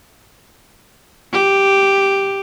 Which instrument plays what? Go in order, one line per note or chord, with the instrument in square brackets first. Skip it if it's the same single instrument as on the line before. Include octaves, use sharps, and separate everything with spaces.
[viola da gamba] G4